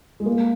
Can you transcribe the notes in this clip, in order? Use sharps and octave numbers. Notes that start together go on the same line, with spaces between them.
G#3
A#3